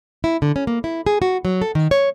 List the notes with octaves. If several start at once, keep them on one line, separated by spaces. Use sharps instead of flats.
E4
D3
C#4
A#3
E4
G#4
F#4
F#3
A4
D#3
C#5